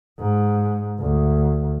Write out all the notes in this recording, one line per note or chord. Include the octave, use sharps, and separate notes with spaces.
G#2
D2